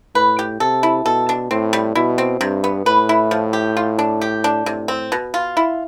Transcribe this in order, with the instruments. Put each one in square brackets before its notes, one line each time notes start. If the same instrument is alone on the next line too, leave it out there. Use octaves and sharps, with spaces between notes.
[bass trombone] A2 [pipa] B4
[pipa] G4
[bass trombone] C3 [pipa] A4
[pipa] E4
[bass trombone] B2 [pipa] A4
[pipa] D4
[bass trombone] A2 [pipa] C4
[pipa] G3
[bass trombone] B2 [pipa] E4
[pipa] C4
[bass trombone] G2 [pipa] C3
[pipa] B3
[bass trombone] A2 [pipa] B4
[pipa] E4
F3
G4
F4
D4
G4
D4
[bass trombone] A2 [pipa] C3
[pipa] C4
B2
F4
E4